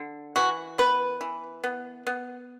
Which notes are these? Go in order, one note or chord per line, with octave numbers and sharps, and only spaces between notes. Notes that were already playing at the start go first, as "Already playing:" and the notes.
Already playing: D3
E3 F#4
B3 B4
E3
B3
B3